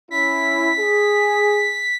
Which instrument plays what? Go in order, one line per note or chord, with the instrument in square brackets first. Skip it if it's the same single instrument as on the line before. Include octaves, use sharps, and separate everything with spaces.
[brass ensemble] C#4 E4 [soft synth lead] B6
[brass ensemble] G#4